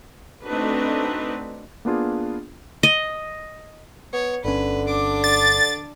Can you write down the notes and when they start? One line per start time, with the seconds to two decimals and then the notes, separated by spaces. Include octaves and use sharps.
0.45 A3 C4 D4 D#4 F#4 B4
1.85 A#3 B3 D4 F4 G#4
2.83 D#5
4.13 B3 C#5
4.45 G1 D3 C#4 B4
4.87 D4 D6
5.24 A6